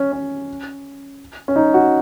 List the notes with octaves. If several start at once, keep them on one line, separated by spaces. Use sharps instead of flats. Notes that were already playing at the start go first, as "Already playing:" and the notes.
Already playing: C#4
C#4
C#4
D#4
F#4